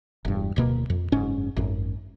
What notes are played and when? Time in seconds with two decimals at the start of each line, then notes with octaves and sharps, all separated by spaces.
0.25 E1 G2
0.56 D1 B2 A#3
0.90 F2
1.12 F#1 G#2 C#4
1.57 G#1 F#2